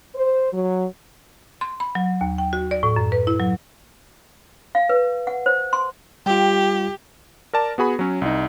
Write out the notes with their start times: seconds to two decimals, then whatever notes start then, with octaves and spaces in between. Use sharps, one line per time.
0.16 C5
0.53 F#3
1.61 C6
1.80 B5
1.95 F#3
2.21 D#2
2.38 G5
2.53 F#4
2.71 D5
2.83 A2
2.96 F#2
3.12 B4
3.27 E4
3.40 F#3
4.75 F5
4.89 B4
5.27 F#5
5.46 C5
5.73 C6
6.26 G3 F4 G4 G5
7.53 A#4 D5 A5
7.78 B3 F#4 G#4 B5
7.99 F#3 C#4
8.22 C2 D#4